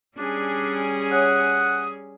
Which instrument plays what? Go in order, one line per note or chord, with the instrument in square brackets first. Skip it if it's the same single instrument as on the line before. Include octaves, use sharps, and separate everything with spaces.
[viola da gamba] G3 C#4 G#4 [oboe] D4
[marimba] C#5 [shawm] F#5 [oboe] D#6